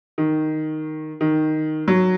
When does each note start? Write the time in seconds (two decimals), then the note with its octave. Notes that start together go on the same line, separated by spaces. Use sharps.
0.18 D#3
1.21 D#3
1.88 F#3